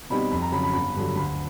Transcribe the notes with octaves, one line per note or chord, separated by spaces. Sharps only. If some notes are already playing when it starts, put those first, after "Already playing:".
B2 G3 C4 D#4 B5
F2 B5
A#5
C#3 F#3 B5
B5
G1 B5
G2 D3 F#3
D2 B5